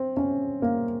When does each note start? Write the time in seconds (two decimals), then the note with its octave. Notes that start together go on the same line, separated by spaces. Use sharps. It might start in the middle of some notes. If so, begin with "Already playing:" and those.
Already playing: C4
0.17 C#4
0.62 A#3